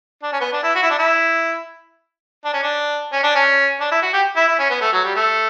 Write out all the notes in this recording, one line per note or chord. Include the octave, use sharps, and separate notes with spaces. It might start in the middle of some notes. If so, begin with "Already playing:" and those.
D4
C#4
B3
D4
E4
F#4
E4
D4
E4
D4
C#4
D4
C#4
D4
C#4
D4
E4
F#4
G4
E4
E4
C#4
B3
A3
F#3
G3
A3